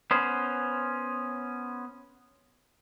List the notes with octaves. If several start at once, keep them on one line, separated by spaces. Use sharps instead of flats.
B3 C#4 C5